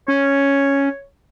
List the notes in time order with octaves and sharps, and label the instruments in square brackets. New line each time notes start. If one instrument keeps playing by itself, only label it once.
[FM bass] C#4 [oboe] C#5